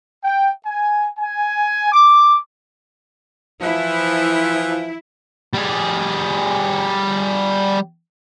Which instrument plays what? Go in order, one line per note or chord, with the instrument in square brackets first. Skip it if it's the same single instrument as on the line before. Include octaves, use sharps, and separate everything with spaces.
[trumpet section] G5
G#5
G#5
D6
[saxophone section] E3 F3 [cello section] E4
[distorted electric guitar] G3 G#4